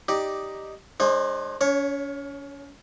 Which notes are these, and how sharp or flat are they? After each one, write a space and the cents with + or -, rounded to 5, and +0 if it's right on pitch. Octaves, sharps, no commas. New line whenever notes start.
D#4 +0 G4 +0 D5 +5
G#3 +0 D4 +35 C5 +35
C#4 +35 C#5 +0